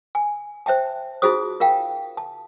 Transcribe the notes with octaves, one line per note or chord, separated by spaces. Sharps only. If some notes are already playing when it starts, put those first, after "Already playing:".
G#5
C5 E5 G5 A5
D#4 F4 F#4 G#4 C5 D#6
F4 A#4 F5 G5
A5